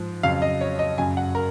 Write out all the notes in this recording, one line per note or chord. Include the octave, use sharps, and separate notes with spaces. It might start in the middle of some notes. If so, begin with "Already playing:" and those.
Already playing: G#2 F3
F2 C#3 F#3 F5
D#5
C#5
D#5
F#2 C#3 F#3 G#5
F#5
A#4